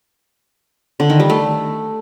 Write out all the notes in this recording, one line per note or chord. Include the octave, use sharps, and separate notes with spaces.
D3
D#3
G3
A3